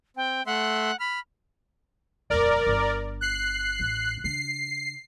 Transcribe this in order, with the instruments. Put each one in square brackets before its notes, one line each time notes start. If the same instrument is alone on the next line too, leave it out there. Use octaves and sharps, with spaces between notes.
[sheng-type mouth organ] C4 [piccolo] G5
[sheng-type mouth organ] A3 E5 C6 [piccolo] F#5
[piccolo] B5 [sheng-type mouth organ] F6
[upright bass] D#1 F2 [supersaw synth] A#4 D5
[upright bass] G1 D4
[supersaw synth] F#6 C7
[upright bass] A1
[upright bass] C#3 D4 [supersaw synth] C7